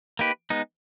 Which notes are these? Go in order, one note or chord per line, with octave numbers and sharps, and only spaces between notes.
A#3 D#4 G4 B4
G#3 B3 D#4